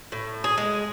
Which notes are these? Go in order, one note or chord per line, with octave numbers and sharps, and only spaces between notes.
A2
G#4
G#3